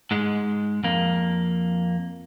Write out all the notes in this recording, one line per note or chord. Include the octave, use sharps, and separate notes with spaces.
G#2 G#3
F2 A#3